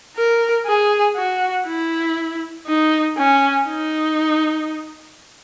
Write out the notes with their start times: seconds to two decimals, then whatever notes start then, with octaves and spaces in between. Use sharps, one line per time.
0.17 A#4
0.66 G#4
1.16 F#4
1.67 E4
2.67 D#4
3.18 C#4
3.68 D#4